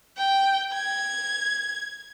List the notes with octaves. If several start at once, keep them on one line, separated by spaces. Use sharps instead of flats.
G5
G#6